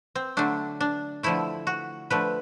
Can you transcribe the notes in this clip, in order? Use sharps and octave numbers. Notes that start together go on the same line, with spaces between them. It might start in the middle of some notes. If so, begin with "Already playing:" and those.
C4
D3 F#3 A3 D4
D4
D3 F3 A3 E4
F#4
D3 F3 A3 B4